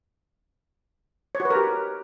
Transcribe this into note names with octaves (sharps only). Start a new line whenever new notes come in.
C#5
F#4
B4
A#4
G4